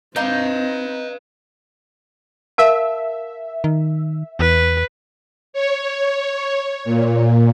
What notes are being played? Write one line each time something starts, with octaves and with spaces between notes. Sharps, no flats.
C4 D#4 B4 F5
A#4 E5 F5 A5
D#3
E2 B4
C#5
A#2